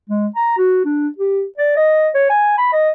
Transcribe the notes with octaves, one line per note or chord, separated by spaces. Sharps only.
G#3
A#5
F#4
D4
G4
D5
D#5
C#5
G#5
B5
D#5